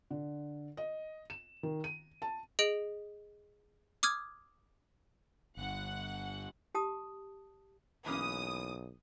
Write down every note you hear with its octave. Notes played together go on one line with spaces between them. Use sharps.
D3
D#5
E7
D#3
D#7
A5
G#4 D#5 D7 F#7
D6 D#6 F6 G#6
G1 G2 F#5
G4 A5 D#6
B1 E3 A#3 C#4 D#6